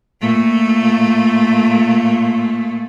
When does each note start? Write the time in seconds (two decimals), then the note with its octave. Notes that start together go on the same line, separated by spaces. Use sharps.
0.21 A#2 A3